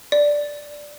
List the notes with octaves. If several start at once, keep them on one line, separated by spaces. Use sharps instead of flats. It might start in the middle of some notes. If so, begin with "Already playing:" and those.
D5